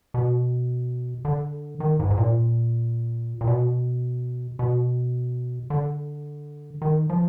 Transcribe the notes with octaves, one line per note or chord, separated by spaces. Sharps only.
B2
D3
D#3
G#2
G#2
A#2
A#2
B2
B2
D3
D#3
F3